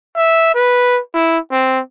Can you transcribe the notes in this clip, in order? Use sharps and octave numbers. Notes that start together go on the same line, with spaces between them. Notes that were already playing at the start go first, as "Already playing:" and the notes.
E5
B4
E4
C4